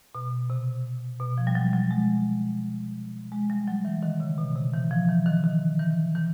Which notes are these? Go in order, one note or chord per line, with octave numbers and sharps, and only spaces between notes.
B2
C3
B2
F3
G3
F#3
F#3
G#3
G#3
G3
F#3
E3
D#3
C#3
B2
C3
E3
F3
E3
D#3
D#3
E3
E3